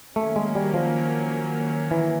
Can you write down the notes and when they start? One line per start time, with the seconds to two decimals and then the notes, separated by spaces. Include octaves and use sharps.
0.16 D#3 F#3 A3 A#3 C#4
0.36 G#3
0.55 G3
0.74 F3
1.91 E3